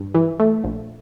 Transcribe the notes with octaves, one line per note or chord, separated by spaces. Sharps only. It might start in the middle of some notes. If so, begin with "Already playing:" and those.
Already playing: G2
E3
A3
A#1